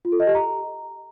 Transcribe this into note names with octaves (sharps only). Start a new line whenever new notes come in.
F4
A4
D#5
G4
A#5